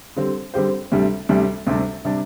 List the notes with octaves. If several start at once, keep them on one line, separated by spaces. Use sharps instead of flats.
D3 G3 C4 G4 C5
D3 G3 C4 G4 C5
D2 C3 G3 D4
D2 C3 G3 D4
D2 C3 G3 D4
C3 G3 D4